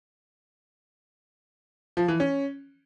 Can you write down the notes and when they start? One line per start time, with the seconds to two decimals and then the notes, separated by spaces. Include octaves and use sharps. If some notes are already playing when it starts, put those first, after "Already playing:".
1.97 F3
2.08 E3
2.20 C#4